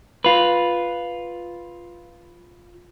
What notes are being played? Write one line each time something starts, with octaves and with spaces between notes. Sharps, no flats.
F4 B4